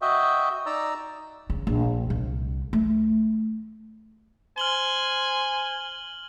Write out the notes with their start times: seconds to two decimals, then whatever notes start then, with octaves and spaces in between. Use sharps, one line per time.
0.02 F#4 D#5 E5 G5
0.66 D#4 D5 A#5 E6
1.50 C#3
1.67 A#1
2.10 C2
2.73 A3
4.58 C5 G#5 F6 F#7 G7